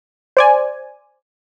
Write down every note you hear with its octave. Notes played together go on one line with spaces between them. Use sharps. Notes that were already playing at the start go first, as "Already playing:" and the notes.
C5 D5 G#5